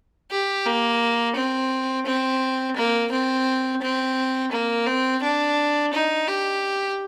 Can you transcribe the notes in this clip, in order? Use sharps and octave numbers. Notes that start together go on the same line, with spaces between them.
G4
A#3
C4
C4
A#3
C4
C4
A#3
C4
D4
D#4
G4